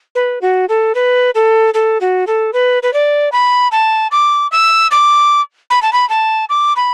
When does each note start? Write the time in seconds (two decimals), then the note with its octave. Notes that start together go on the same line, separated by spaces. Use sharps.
0.15 B4
0.42 F#4
0.69 A4
0.95 B4
1.35 A4
1.74 A4
2.01 F#4
2.27 A4
2.53 B4
2.83 B4
2.93 D5
3.32 B5
3.72 A5
4.12 D6
4.52 E6
4.91 D6
5.70 B5
5.82 A5
5.93 B5
6.09 A5
6.49 D6
6.76 B5